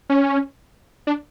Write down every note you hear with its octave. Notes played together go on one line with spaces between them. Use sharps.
C#4
D4